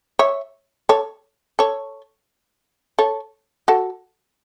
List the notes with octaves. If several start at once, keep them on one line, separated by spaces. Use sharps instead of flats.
C#5 E5
A4 C#5
A4 C#5
A4 C#5
F#4 A4